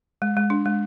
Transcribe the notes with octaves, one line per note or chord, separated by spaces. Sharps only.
G#3
G#3
D4
G#3